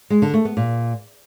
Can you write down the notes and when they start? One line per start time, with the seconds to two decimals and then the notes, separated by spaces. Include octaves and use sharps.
0.10 G#3
0.22 D3
0.34 A3
0.45 B3
0.57 A#2